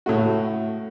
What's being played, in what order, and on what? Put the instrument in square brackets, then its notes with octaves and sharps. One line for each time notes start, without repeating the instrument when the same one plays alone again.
[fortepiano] A2 A3 F#4